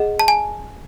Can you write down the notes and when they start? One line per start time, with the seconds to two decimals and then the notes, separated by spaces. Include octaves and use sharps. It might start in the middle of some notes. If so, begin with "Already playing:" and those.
Already playing: G#4 D#5 F#5
0.19 A5
0.28 G#5